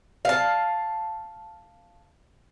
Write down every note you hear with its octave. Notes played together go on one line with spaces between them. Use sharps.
F5 A5